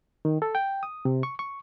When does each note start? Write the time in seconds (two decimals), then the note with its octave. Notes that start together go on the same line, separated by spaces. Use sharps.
0.25 D#3
0.42 A4
0.55 G5
0.83 D#6
1.05 C3
1.23 C#6
1.39 C#6